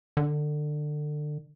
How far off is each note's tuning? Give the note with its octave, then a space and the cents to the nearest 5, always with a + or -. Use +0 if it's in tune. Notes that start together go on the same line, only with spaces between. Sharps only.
D3 +25